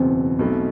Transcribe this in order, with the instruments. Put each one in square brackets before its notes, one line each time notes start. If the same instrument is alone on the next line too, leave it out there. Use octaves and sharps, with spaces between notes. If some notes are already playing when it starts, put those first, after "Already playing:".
Already playing: [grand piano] F#1 E2 B2 [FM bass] C4
[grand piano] B1 B2 A3